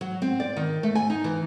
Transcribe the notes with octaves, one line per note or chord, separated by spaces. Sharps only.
F#3
C4
D5
D#3
A3
G#5
D#4
E3